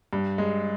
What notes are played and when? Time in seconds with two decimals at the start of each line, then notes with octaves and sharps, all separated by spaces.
0.13 G2
0.38 G#3